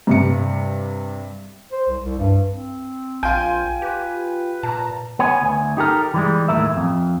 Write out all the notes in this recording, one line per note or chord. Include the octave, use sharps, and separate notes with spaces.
G2 C3 C#7
C5
C2
C2
G2
C4
A#1 F4 G5 G#5
G4 B4
A#2 A5 A#5
B3 C#5 G#5
D2 G#5
D#4 G4 A4 A#4
E3 G3 G#3
D#2 A2 A#4 E5
F2